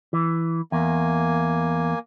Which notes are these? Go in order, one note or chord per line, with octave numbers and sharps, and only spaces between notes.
E3
E2 A#3 G#5